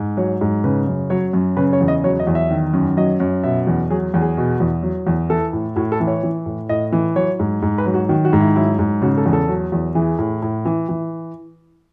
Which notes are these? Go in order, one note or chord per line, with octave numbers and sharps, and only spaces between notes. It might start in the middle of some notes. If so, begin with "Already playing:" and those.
Already playing: G#2
F#3 C#5
G#2
C#3 B4
F#2
F#3 C#5
F#2
C#3 B4
C#5
E2
D#5
F#3 C#5
D#5
E2
E5
D#3
F#2
F#3 D#5
F#2
B2 E5
E2
F#3 G#4
E2
G#4
B2
E2
F#3
E2
E3 A4
A2
A2 F#4
A4
E3
C#5
E3
A2
A2 D#5
E3
F#3 C#5
G#2
G#2
B4
F#3
F#4
D#3 F#4
F#4
G#2
E4
F#3 E4
G#2
C#3 F#4
A4
E2
A4
F#3
E2
E3 G#4
A2
A2
E3
E3